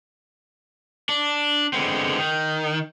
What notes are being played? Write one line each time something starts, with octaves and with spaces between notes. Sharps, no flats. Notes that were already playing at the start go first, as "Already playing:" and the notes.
D4
D3 G#3 B3 C4
D#3